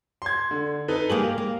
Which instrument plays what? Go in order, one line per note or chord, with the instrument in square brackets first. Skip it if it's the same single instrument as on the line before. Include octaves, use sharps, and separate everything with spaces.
[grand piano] C6 G#6
D3
D#4 A4 B4
[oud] A#3 G4 G#4 [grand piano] F#7
[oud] A#3